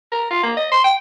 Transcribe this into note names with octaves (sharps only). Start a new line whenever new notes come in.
A#4
F4
A#3
D#5
C6
G5